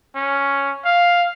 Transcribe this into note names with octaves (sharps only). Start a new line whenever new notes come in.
C#4
F5